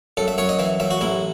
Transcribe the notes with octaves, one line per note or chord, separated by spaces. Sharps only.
F#2 A4
E5
F#2 C#5
D#5
E3 E5
F#2 E5
F#4
A1 E4